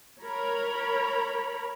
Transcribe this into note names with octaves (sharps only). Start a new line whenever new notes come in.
A#4 C#5 A#5 B5